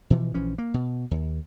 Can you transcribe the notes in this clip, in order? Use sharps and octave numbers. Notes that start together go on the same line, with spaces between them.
B2 E3 F3
A#1 E3 F3 C#4
A#3
B2
D#2